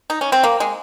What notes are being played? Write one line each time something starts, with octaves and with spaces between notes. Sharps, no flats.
D#4
C#4
C4
A#3
G#3